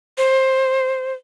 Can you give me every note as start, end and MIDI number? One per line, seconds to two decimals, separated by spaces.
0.18 1.13 72